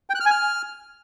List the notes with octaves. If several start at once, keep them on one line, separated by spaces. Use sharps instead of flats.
G5
F#6
F6
G#5
F6